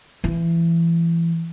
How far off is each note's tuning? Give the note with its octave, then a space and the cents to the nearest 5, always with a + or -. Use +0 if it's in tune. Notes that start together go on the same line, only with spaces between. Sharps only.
E3 +25 A3 -40